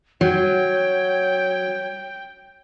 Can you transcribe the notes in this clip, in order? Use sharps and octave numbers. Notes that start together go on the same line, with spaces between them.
F#3 C#5 G5